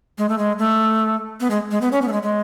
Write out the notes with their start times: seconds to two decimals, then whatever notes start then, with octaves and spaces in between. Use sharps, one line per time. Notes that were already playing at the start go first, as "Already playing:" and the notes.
0.18 G#3
0.29 A3
0.38 G#3
0.58 A3
1.40 B3
1.51 G#3
1.71 G#3
1.81 B3
1.92 C#4
2.02 B3
2.08 A3
2.12 G#3
2.23 G#3